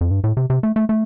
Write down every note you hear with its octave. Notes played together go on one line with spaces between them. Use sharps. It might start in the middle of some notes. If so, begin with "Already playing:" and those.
F2
G2
A2
C3
C3
A3
A3
A3